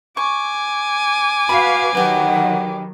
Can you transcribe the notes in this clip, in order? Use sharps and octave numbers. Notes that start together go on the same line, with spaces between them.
G#5 C#6 D6
F#4 B4 F5 B5
D#3 F#3 G4 B4 F#5